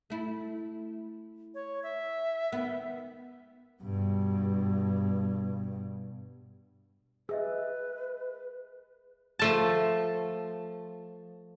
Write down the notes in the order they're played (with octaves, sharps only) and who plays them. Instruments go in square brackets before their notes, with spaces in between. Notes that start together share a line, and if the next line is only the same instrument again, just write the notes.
[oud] A3 E4
[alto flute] C#5
E5
[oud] D#3 B3
[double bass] G2 B2
[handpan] G#4 [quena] B4 [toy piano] D#5 E5 E6
[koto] F3 A3 A5